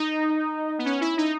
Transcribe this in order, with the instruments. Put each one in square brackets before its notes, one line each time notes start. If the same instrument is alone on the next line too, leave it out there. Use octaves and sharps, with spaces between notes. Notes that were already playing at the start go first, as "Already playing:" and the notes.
Already playing: [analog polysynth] D#4
B3
C#4
E4
D#4